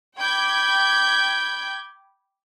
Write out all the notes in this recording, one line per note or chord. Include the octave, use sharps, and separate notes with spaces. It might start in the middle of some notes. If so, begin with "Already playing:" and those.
G5 B5 D6 G6 G#6